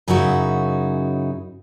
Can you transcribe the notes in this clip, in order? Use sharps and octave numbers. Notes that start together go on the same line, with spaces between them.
F#2 C#3 C#4 D#4 E4 F#4